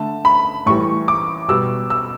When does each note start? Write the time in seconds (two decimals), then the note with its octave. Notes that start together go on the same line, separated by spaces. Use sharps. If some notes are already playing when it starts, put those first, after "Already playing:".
Already playing: D3 A3 A5
0.25 B5
0.66 A2 E3 G3 C#6
1.08 D6
1.48 B2 G3 E6
1.90 E6